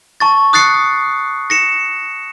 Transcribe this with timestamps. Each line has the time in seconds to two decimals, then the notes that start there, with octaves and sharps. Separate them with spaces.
0.20 A5 C#6 A6
0.53 D#6 F#6 A6 C7 C#7
1.50 A#6 C#7 E7